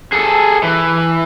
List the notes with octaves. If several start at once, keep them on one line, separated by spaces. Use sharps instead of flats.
G#4 A4
E3